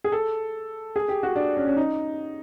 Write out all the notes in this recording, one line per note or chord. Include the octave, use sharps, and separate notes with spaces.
G#4
A4
G#4
G4
F#4
D4
C#4
C#4
D#4